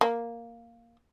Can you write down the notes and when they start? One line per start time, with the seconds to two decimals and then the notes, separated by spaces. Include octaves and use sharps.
0.01 A#3